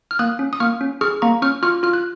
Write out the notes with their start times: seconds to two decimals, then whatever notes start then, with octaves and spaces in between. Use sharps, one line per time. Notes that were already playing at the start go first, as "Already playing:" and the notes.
0.11 F6
0.19 A#3 D#6 F#6
0.39 C#4
0.53 D#6
0.60 A#3 C#6 F6
0.81 C#4
1.01 G#4 C#6 F6
1.22 A#3 A#5 C#6
1.42 C#4 C#6 F6
1.63 F4 C#6 F6
1.83 F4 F6
1.93 F#6